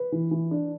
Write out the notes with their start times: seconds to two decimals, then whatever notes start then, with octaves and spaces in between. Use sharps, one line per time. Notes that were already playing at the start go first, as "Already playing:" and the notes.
Already playing: B4
0.12 E3
0.31 E3
0.51 D4